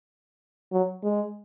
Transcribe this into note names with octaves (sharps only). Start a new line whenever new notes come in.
F#3
G#3